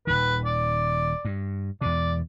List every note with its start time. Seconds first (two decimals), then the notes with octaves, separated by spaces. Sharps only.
0.07 D#1 D#3 B4
0.45 D5
1.25 G2
1.81 E2 B2 D5